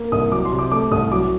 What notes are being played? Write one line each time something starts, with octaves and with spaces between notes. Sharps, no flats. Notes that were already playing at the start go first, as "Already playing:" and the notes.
Already playing: A#3
C2 D#6
F#3 D6
C6
C3
D6
A3 D6
C2 D#6
F#3 D6